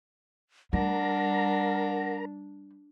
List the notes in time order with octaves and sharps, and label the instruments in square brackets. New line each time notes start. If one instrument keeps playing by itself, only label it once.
[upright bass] G3 [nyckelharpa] D4 [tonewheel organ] A#4 A#5 [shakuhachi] F#5